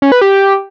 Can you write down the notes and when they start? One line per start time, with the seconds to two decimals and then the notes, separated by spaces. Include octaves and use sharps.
0.02 C#4
0.12 B4
0.21 G4